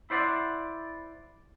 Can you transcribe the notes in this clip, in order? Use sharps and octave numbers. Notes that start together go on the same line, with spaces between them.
E4 C5 D5 F#5